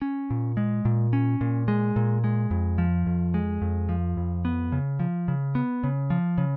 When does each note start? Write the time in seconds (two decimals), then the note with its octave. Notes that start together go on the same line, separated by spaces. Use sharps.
0.02 C#4
0.30 A#2
0.57 G#3
0.85 A#2
1.13 C#4
1.41 A#2
1.68 G#3
1.96 A#2
2.24 G#3
2.51 F2
2.78 F3
3.06 F2
3.34 G#3
3.61 F2
3.89 F3
4.17 F2
4.45 B3
4.72 C#3
5.00 F3
5.28 C#3
5.55 B3
5.84 C#3
6.10 F3
6.38 C#3